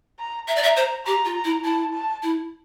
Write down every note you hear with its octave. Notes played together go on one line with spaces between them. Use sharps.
A#5
E5 A#5
D5
E5
C5
G4 A#5
F4
A#5
E4
E4 A5
A5
E4